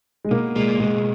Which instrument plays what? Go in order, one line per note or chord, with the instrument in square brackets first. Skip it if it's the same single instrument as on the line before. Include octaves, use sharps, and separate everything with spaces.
[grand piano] G#3
[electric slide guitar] B2 [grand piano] A#3
[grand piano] G#3 [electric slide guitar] A#3
[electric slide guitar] B2 [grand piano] G#3